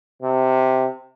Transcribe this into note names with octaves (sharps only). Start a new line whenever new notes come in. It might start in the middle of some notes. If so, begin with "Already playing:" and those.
C3